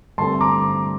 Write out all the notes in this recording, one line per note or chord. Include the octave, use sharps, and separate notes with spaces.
G2 D3 A3 C4 A5 C6
A#5 D6